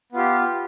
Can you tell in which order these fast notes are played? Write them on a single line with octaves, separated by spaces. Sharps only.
B3 F4 G4